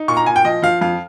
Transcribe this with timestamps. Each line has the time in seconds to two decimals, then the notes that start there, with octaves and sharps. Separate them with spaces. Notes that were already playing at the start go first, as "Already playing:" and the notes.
Already playing: D#4
0.08 A#2 C#6
0.17 A#5
0.26 A#2 G#5
0.36 G5
0.44 F3 D#5
0.62 F3 F5
0.81 F2 F5